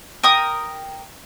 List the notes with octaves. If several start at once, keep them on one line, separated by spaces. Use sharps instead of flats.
A#4 G5 D#6